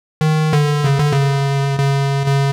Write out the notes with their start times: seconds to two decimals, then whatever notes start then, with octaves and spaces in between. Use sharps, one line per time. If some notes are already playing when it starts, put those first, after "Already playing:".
0.21 D#3
0.53 D3
0.84 C#3
0.98 D3
1.13 C#3
1.79 C#3
2.26 C#3